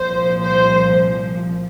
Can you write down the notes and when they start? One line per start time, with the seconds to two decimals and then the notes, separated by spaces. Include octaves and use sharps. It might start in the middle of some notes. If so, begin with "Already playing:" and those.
Already playing: C2 A#2 F3 C5
0.42 C5